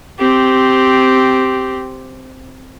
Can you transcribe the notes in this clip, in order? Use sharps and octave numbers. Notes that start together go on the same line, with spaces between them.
C4 G4